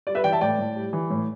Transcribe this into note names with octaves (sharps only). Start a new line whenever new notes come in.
G3 D5
B4 E5
E3 D5 G5
E5 A5
A2 D5 G5
A2
G3
E3
A2